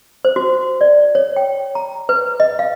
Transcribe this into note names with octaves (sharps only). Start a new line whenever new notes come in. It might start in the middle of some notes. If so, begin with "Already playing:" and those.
C5
F#4
D5
C#5
G5
A#5
B4
D#5
F5